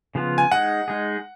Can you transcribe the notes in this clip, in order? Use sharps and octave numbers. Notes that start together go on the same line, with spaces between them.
C#3 F3 B3 F4
G#5
G#3 D#4 G#4 F#5
G#3 D#4 G#4